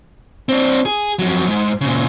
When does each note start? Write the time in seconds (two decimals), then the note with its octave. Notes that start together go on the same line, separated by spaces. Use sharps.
0.49 C4 D4
0.85 G#4
1.19 F2 F#3
1.49 G#2
1.81 A#2 C#3